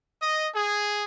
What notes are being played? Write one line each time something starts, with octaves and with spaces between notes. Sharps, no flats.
D#5
G#4